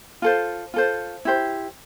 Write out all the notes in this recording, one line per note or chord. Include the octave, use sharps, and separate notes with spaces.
F4 A4 C5
F4 A4 C5
E4 G4 C5